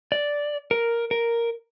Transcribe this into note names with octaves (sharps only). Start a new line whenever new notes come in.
D5
A#4
A#4